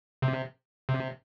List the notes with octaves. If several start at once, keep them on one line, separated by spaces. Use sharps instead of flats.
C3
C3